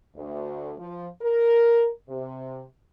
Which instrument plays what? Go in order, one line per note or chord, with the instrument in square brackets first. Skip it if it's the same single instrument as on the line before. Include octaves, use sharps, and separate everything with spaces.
[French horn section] D2
F3
A#4
C3